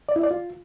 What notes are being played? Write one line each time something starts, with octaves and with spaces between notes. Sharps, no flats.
D5
E4
D5
F4